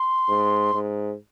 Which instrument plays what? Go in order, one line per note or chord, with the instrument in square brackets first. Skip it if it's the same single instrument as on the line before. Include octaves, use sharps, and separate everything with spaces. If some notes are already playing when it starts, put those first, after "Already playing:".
Already playing: [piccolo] C6
[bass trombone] G#2
G#2